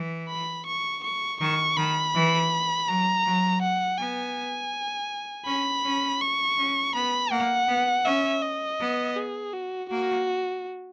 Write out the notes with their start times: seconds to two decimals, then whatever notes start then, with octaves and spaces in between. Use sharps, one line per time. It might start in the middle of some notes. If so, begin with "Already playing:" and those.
Already playing: E3
0.29 B5
0.66 C#6
1.03 C#6
1.40 D#3 C#6
1.77 D#3 B5
2.14 E3
2.88 F#3 A#5
3.25 F#3
3.62 F#5
3.98 B3 G#5
5.46 C#4 B5
5.84 C#4
6.21 C#6
6.58 C#4
6.95 B3 B5
7.31 A#3 F#5
7.68 B3
8.05 C#4 E5
8.42 D#5
8.79 B3
9.16 G#4
9.53 F#4
9.90 A#3 F#4